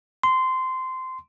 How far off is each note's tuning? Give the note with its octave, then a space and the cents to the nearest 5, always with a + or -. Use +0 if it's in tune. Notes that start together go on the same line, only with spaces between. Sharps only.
C6 -15